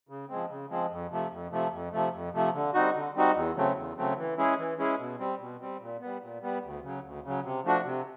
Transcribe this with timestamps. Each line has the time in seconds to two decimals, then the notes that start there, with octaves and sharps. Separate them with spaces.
0.09 C#3
0.29 F3 G#3 C4
0.49 C#3
0.70 F3 G#3 C4
0.91 F2
1.11 C3 F3 A3
1.31 F2
1.51 C3 F3 A3
1.73 F2
1.92 C3 F3 A3
2.13 F2
2.34 C3 F3 A3
2.54 D3
2.74 G3 C4 D#4 F#4
2.95 D3
3.16 G3 C4 D#4 F#4
3.35 E2
3.57 C#3 F#3 A3 C4
3.76 E2
3.97 C#3 F#3 A3 C4
4.18 E3
4.38 G#3 C#4 E4 G#4
4.58 E3
4.79 G#3 C#4 E4 G#4
4.99 B2
5.19 G3 C4
5.40 B2
5.61 G3 C4
5.81 A#2
6.01 G3 B3
6.22 A#2
6.42 G3 B3
6.63 D2
6.83 C#3 F#3
7.04 D2
7.24 C#3 F#3
7.44 C3
7.64 F3 A3 D4 F#4
7.85 C3